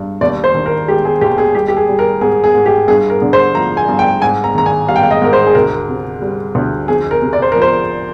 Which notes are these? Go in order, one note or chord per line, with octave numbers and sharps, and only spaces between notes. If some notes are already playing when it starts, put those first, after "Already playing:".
Already playing: G2
D#2 D5
C5
D#3
A#4
G#3 G4
G#4
D#2 G4
G#4
G3 G4
G4
G#4
G3
A#4
G#2 G#4
G#4
G#2
G4
G2 G#4
A#4
D3
C5
F3 A#5
G#5
G2
G5
G#2 G#5
A#5
D#3 A#5
G#5
G3 F5
G5
F5
D#5
G#2 A#4
C5
G#4
D2 A#4
C3
G3
D2
F2 G#4
A#4
C3
D5
C5
F3 A#4
C5